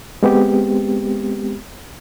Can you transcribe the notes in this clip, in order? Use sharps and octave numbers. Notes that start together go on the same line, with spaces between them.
G#3 B3 C4 G4